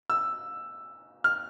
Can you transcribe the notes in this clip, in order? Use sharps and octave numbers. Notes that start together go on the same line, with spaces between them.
E6
F6